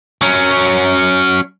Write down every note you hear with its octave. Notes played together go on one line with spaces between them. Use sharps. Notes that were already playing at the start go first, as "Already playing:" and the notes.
F#3 C#4